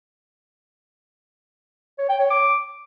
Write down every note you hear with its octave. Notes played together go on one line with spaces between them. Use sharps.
C#5
G5
C#5
D6